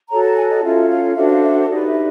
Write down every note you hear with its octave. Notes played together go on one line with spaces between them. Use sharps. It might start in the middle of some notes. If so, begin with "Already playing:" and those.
F#4 A4 C#5 A#5
A5
G#5
D#5
C#4 F4 A4 E5
F5
D4 F#4 A4 C5 E5
F5
E5
D#4 G4 B4 D5
E5